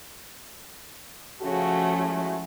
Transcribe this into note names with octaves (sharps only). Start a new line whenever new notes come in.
C#3 F3 A3 C#4 F#4
G#3 E4 F#4